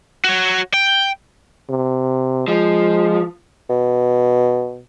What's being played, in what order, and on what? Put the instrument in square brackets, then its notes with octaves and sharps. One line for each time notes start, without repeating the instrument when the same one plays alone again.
[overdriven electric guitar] F#4 C#5
G5
[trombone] C3
[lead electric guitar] F3 [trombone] G#3
[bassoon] B2